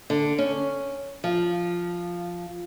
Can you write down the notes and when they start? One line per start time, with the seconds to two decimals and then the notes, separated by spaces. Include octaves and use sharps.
0.10 D3
0.38 C#4
1.24 F3